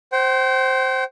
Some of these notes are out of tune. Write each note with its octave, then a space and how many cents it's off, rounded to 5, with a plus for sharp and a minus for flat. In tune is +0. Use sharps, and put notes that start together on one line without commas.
C5 +5 G5 -40